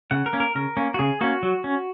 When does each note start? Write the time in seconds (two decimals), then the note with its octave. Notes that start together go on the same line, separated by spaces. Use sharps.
0.11 C#3 F#5
0.26 A#4
0.33 A#3 C#4
0.40 A#4
0.55 C#3 A#4
0.77 A#3 C#4
0.94 F#4
0.99 C#3 G#4
1.21 A#3 C#4 F#4
1.43 F#3
1.64 C#4